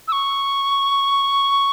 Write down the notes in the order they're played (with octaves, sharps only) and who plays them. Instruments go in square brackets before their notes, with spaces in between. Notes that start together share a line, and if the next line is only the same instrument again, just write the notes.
[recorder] E6
C#6